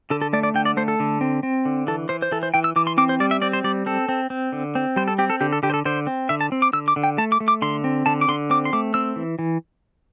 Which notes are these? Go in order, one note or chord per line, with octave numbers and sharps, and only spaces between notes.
D3 A4
A4
A3 D5
D5
D3 G5
D5
A3 C5
A4
D3
C4
C4
D3
E3 A4
E3 C5
C5
E3 A4
C5
E3 G5
E6
E3 D6
C6
C4 D6
C5
G3 D5
E5
C4 D5
C5
G3 D5
C4 A4
C4
C4
D3
C4
G3 C5
A4
C4 G4
A4
D3 G4
A4
D3 G4
C5
A4
D3 C5
C4
D3 E5
A5
C4
D6
D3 E6
D6
D3
G5
A3 A5
D6
A3
D6
D3 C6
C4
D3 A5
D6
D3 C6
C4 D6
C6
A3 D6
C4 E6
E3
E3